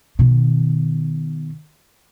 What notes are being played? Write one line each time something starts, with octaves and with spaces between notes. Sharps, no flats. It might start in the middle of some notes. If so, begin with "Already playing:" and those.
B2 D#3